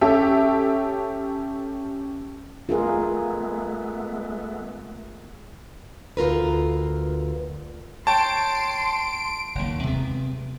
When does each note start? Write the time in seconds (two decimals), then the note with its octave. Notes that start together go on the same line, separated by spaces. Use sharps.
0.01 C#4 G4 A4 E5
2.69 G#3 A3 B3 F4 G#4 A#4
6.17 D2 F4 A#4 B4
8.07 C#5 G5 A5 C6 D7
9.55 F#1 D#2
9.83 C3 G#3 A3 B3